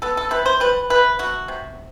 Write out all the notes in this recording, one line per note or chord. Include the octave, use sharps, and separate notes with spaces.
B3 A4
A4
C3 B4
C5
G3 B4
C3 B4
A3 F#4
C3